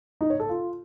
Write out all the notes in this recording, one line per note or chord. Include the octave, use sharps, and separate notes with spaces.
D#4
C#5
A4
F4